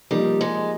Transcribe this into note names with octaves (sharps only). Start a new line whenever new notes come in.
F3 G3 A#3 D#4
G#3